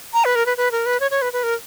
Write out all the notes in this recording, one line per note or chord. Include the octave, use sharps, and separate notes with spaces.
A#5
B4
A#4
B4
B4
A#4
B4
C#5
C#5
B4
B4
A#4